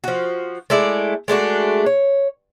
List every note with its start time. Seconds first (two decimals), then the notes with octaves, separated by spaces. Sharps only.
0.04 F3 F#4
0.70 G#3 A3 E4 D5
1.28 G#3 A3 D4 F#4
1.86 C#5